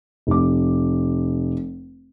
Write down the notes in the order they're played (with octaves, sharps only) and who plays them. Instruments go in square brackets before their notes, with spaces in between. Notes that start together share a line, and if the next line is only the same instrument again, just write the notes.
[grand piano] F1 D6